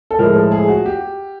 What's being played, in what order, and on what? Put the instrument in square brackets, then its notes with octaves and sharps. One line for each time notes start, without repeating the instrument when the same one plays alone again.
[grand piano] A4
A2 F3 G#3 A#4
A4
G#4
F#4
G4